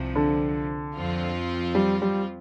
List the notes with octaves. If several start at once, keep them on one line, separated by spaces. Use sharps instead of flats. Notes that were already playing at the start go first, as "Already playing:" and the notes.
Already playing: C2 C3 F3
D3
F2 F3 C4 F4
G3
G3